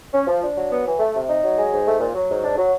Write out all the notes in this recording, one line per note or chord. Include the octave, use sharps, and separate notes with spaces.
C#4
F3
D4
F#3
B3
E3
A3
C3
D#4
F#3
G#3
G#2
A3
A#2
F#3
G#2
D4
F#3